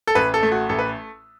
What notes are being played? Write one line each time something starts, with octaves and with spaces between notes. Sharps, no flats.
A4
A1 B4
A4
A3
F#4
A1 A4
B4